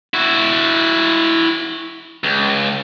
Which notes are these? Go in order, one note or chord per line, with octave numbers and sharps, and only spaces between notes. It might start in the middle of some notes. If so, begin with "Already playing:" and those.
E4 F#4
C#2